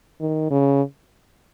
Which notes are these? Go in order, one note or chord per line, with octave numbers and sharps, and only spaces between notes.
D#3
C#3